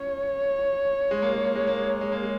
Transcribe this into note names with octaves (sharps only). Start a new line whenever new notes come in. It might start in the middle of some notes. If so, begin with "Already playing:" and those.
Already playing: C#4 C#5
G#3
A#3
G#3
A#3
G#3
A#3
G#3
A#3
G#3
A#3
G#3